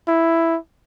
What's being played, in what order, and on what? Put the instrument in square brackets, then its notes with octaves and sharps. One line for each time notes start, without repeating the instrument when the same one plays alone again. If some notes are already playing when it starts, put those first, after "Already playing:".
[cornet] E4